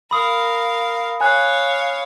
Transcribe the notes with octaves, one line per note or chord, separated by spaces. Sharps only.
A#4 F5 B5 D#6
C#5 F5 G#5 F#6